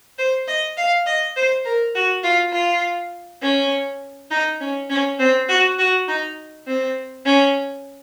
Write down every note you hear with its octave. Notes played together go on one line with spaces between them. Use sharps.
C5
D#5
F5
D#5
C5
A#4
F#4
F4
F4
C#4
D#4
C#4
C#4
C4
F#4
F#4
D#4
C4
C#4